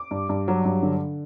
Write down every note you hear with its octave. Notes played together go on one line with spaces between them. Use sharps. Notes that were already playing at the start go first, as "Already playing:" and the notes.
Already playing: D6
G2
G2
F#3
G2
D3